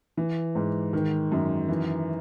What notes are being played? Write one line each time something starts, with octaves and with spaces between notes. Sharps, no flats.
E3
G#2
D#3
F#2
E3